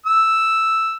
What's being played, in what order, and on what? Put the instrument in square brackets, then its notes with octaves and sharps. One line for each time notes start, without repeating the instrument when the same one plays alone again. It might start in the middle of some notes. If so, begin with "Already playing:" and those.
[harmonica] E6